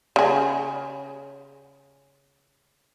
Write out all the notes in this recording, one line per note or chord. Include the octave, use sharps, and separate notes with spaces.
C#3 G#4